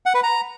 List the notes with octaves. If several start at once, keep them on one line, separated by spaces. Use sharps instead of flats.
F#5
B4
A#5